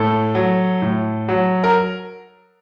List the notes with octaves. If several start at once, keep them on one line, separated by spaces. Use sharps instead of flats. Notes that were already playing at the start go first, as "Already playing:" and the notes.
Already playing: A2 A4
F#3
A2
F#3
A#4